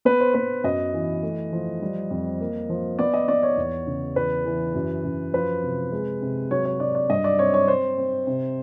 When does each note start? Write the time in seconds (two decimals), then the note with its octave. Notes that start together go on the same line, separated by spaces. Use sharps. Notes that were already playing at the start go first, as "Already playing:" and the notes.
0.05 B3 B4
0.20 C5
0.34 B3 B4
0.64 F#2 D#5
0.93 E3
1.23 A3
1.52 F3
1.82 G3
2.10 F2
2.40 A#3
2.69 F3
2.99 B3 D5
3.14 D#5
3.28 B3 D5
3.43 C#5
3.57 E2
3.87 C#3
4.16 E2 B4
4.45 E3
4.75 F#2
5.04 F#2
5.33 F3 B4
5.63 C3
5.92 G#3
6.22 C3
6.51 F#3 C#5
6.65 C#5
6.80 F#3 D5
6.95 D5
7.10 G2 D#5
7.24 D5
7.39 C4 C#5
7.54 C#5
7.68 C4 C5
7.98 C4
8.27 C3